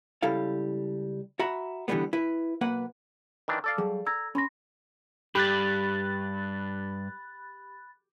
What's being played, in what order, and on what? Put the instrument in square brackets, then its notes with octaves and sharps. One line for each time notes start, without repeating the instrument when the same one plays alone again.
[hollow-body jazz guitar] C#2 G3 E4 A4 F5
F#4 E5 A#5 B5
D3 E3 F3 G3 G#3 B3
E4 B4
B1 A#3 B4 F#5
[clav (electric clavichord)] D#3 E3 D4
A4 D5 F5
[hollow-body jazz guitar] F#3 G3 [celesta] G#4
[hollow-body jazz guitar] A#5 [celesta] E6 G#6 A#6
[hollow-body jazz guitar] C#4 [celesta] B5 C6 A#6
[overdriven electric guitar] G2 [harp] G4 [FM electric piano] B5 F#6 A6